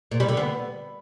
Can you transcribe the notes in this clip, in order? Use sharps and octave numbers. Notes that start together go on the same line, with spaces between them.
A#2
G3
D3
B3